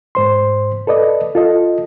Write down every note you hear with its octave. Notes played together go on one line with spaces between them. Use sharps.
G#2 C5 C6
A4 B4 D5 D#5
F4 A4 D#5